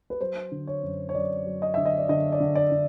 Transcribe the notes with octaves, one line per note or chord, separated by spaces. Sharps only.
B4
F#3 C5
D3
C#5
F#2
C#5
F#2 D5
F#3
D#5
D3 E5
D#5
D5
D3 D#5
D5
D3
D5
D3